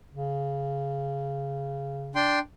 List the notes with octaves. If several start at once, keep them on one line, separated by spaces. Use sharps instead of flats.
C#3
D4 G5 C6